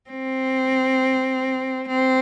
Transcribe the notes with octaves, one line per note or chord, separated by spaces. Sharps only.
C4
C4